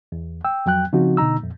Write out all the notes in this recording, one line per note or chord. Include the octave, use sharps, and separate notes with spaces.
E2
G5 E6
F2 F#3 G5 F#6
C#3 F3 C4 D#4 F#4
B2 D3 D#4 A#5 E6
F2 A#2